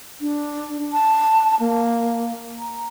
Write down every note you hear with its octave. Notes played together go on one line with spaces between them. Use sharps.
D4
A5
A#3
A#5